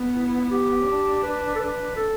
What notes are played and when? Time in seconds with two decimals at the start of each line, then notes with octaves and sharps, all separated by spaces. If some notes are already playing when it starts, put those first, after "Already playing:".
Already playing: B3
0.15 E4
0.26 E4
0.38 E4
0.50 G4
0.87 D4
1.23 B4
1.55 A4
1.59 B4
1.96 A4